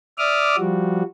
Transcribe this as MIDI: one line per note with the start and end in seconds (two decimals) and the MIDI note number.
0.18 0.56 74
0.18 0.56 76
0.18 0.56 86
0.18 0.56 87
0.18 0.56 89
0.58 1.03 53
0.58 1.03 55
0.58 1.03 66